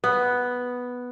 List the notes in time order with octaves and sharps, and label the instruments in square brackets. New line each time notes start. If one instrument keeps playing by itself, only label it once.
[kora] B3